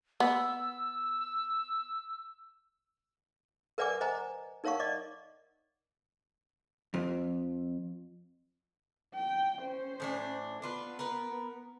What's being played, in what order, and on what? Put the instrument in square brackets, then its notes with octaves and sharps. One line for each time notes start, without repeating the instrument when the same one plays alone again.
[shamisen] B3 [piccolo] E6
[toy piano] A#4 B4 D5 F#5 G#5 D6
C5 D#5 F#5 G#5 A#5
D#4 A#4 C#5 F5 F#5 C#6
D5 D#5 D6
[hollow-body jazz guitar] F2
[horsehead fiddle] G5
C#4 C5
[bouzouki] A2 E3 D4
[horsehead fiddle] B3 [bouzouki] D4 F4 B4
[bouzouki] A#4 B4